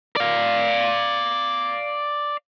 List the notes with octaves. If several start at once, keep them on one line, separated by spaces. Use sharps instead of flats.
D5 F5